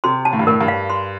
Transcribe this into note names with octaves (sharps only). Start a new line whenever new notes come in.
C3 C6
A5
A2
G2
A2 A#4
G2
F5
C6